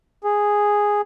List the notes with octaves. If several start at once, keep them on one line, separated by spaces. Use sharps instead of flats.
G#4